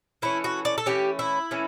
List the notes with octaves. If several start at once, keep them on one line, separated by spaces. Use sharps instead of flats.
E3 A3 C#4 E4
F#4
D5
A4
E3 A3 C#4 G4
E4
E3 A3 C#4